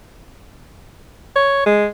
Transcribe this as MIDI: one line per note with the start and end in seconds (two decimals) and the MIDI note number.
1.36 1.63 73
1.66 1.87 56